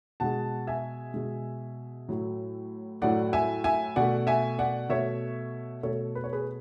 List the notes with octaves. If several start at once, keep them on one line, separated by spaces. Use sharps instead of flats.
B2 G#3 F#5 A5
E5 G#5
B2 G#3
A2 F#3 A3
A2 F#3 A3 D5 F#5
E5 G#5
E5 G#5
B2 A3 D5 F#5
E5 G#5
D5 F#5
B2 A3 C#5 E5
B2 A3 A4 C#5
B4
C#5
G#4 B4